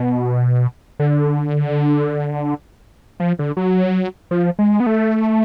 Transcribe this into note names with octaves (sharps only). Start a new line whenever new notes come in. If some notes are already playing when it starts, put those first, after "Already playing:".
Already playing: B2
D3
F3
D3
F#3
F3
G#3
B3
A3